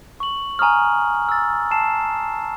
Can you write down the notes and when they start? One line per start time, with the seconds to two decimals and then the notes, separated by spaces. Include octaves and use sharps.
0.20 C#6 F#7
0.59 G#5 A#5 C#6 D#6 F6
1.29 E6 A6
1.71 A5 C7 E7